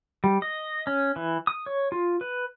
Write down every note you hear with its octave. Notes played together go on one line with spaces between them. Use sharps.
G3
D#5
C#4
E3
D#6
C#5
F4
B4